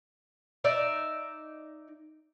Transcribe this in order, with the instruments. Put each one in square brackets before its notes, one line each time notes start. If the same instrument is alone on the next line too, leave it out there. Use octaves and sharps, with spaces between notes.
[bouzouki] D#4 D5 E5